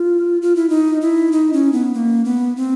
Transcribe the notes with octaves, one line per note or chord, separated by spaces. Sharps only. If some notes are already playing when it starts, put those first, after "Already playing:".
Already playing: F4
F4
E4
D#4
E4
D#4
C#4
B3
A#3
B3
C4